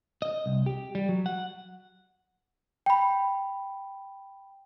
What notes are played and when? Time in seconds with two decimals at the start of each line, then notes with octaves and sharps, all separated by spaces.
0.22 D#5
0.46 C2
0.66 G4
0.95 G3
1.09 F#3
1.26 F#5
2.86 G5 B5